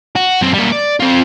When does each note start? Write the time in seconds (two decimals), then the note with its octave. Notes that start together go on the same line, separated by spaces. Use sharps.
0.16 F#4
0.41 F#2 C4
0.54 G3 A#3
0.72 D5
1.00 C4 F4